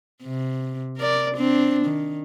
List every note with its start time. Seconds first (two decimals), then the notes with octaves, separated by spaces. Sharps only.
0.23 C3
0.97 A#4 D5
1.35 C4 D4
1.86 D#3